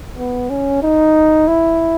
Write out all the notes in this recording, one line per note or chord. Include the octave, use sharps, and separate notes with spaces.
B3
C#4
D#4
E4